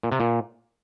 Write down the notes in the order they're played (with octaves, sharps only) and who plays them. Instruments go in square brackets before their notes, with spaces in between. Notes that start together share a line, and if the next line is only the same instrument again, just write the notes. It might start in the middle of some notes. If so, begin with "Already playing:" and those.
[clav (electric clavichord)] A#2
C3
A#2